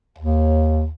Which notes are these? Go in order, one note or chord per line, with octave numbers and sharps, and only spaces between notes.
D#2